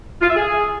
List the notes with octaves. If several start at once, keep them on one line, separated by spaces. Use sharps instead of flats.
F4
E5
G#4